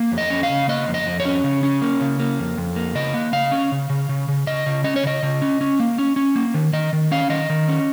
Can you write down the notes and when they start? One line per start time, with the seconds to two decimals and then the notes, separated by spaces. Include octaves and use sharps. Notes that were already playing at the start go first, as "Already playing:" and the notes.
Already playing: A#3
0.12 F2
0.18 D#5
0.30 C#4
0.43 F5
0.49 C#3
0.68 A#3 D#5
0.88 F2
0.94 D#5
1.06 F2
1.20 C#5
1.25 C#4
1.44 C#3
1.63 C#4
1.82 A#3
2.01 C#3
2.20 A#3
2.39 F2
2.58 F2
2.76 A#3
2.95 C#3 D#5
3.14 A#3
3.33 C#3 F5
3.52 C#4
3.72 C#3
3.90 C#3
4.09 C#3
4.28 C#3
4.47 C#3 D#5
4.66 C#3
4.84 C#4 D#5
4.96 C#5
5.03 C#3 D#5
5.23 C#3
5.42 C#4
5.61 C#4
5.80 A#3
5.98 C#4
6.16 C#4
6.36 A#3
6.54 D#3
6.73 D#3 D#5
6.93 D#3
7.11 C#4 F5
7.30 D#3 D#5
7.50 D#3
7.69 C#4